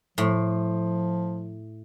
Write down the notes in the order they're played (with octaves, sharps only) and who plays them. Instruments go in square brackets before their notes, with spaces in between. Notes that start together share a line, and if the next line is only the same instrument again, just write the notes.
[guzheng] A2 [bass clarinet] F3